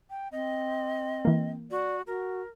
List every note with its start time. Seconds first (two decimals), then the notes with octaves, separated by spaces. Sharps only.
0.10 G5
0.32 C4 D#5
1.25 E3 A#3
1.71 F#4 D5
2.07 F#4 A#4